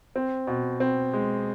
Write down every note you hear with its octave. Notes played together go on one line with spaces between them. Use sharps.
C4
B2
C4
G#3